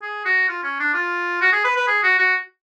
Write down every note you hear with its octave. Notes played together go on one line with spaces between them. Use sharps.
G#4
F#4
F4
C#4
D4
F4
F#4
G#4
B4
B4
G#4
F#4
F#4